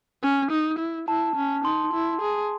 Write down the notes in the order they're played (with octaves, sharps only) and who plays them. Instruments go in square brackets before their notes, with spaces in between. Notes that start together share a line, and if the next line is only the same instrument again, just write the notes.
[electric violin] C#4
D#4
E4
[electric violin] E4 [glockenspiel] A5
[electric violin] C#4
[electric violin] D#4 [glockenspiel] C6
[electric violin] E4
G#4